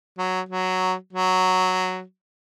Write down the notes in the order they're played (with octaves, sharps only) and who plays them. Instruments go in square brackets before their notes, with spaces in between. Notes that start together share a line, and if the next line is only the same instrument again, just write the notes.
[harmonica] F#3
F#3
F#3